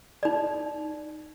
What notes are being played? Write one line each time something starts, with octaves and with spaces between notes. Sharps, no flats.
D#4 D5